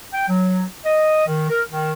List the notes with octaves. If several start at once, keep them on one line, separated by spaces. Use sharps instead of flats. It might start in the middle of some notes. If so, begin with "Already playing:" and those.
G5
F#3
D#5
D#3
A#4
D#3